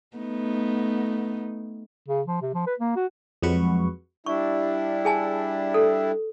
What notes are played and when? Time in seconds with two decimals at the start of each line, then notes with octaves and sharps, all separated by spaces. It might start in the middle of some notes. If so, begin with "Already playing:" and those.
0.17 A3 B3 D#4
2.08 C#3
2.27 F3
2.42 C3
2.54 F3
2.66 B4
2.79 A#3
2.96 F#4
3.42 F2 F#3 G#3 F#4 B4 C#6
4.26 G3 D4 E4 C#6
5.05 G#4 G#5 A5
5.74 A4